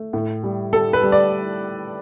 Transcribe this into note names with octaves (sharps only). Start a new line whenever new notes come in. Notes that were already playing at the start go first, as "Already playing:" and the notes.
Already playing: A3
A2
G3
G3 A4
B4
G3
D5